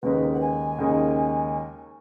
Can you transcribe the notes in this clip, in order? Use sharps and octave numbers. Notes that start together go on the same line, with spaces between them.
D#2 C#3 G#3 D#4 A#4 B4
F#5
G#5
D#2 C#3 G#3 D#4 A#4